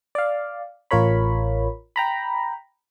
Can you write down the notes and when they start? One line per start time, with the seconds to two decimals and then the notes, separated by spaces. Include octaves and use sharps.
0.15 D5 F5
0.91 A1 F4 A#4 C#5 B5
1.96 G5 A#5 B5